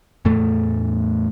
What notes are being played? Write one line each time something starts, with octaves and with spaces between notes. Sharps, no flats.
E2 A2 A3